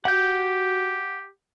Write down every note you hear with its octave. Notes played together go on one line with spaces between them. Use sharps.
F#4 G4 F#5 G6